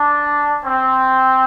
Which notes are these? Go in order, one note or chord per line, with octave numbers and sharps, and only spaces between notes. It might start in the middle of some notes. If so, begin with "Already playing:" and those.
Already playing: D4
C4